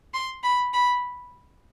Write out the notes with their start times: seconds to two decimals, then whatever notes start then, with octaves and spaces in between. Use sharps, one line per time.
0.14 C6
0.44 B5
0.73 B5